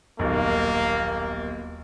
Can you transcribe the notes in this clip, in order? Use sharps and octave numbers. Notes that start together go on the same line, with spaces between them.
D#1 B1 A#3